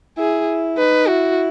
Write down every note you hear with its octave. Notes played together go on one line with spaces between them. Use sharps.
E4 G#4
D#4 B4
E4 F#4